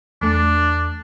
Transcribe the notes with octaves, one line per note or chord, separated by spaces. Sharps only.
E2 A3 D4